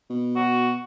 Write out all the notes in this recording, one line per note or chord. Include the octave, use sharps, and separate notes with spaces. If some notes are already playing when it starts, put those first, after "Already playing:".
B2
F#4